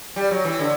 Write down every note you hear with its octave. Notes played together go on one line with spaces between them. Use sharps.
G3
F#3
E3
D3